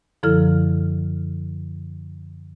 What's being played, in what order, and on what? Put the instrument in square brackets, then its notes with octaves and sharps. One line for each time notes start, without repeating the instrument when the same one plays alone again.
[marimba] F#2 D3 F3 E4 A4 F6